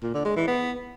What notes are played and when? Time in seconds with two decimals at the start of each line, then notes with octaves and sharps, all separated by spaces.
0.03 A#2
0.14 D3
0.25 G#3
0.36 E3
0.47 B3